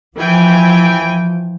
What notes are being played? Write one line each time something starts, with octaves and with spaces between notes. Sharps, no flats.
E3 F3 G5 G#5